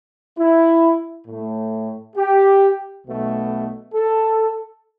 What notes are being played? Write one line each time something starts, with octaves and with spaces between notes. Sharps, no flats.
E4
A2 A3
G4
B1 B2 A3
A4